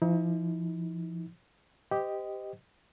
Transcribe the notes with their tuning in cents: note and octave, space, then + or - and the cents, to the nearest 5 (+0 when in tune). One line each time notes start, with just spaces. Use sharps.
F3 -35 D#4 +40
G4 +0 C5 -40 D#5 +0